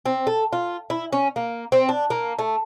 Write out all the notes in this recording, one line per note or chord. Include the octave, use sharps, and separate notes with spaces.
C4
A4
F4
E4
C#4
A#3
C4
D4
A#3
A3